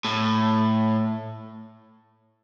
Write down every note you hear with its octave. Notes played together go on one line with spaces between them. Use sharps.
A2